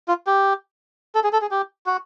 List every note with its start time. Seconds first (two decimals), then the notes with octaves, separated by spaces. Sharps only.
0.08 F4
0.27 G4
1.15 A4
1.24 G#4
1.33 A4
1.42 G#4
1.51 G4
1.86 F#4